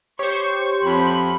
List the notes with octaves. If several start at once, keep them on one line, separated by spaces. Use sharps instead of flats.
G4 C5 C#5 C#6
F2 B5